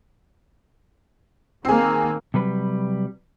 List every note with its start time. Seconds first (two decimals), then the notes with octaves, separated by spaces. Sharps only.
1.65 D#3 A#3 C4 G#4
2.34 C3 F#3 G3 B4